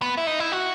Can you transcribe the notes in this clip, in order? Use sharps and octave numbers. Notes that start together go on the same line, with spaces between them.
B3
E4
D#4
E4
F#4